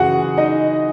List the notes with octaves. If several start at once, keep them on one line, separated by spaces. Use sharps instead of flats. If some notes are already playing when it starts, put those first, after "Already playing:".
Already playing: F#2 C#3 E3 F#4 G#4 F#5
D#4 D#5